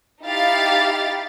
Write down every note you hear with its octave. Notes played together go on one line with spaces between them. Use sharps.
D#4 E4 G4 F5 A6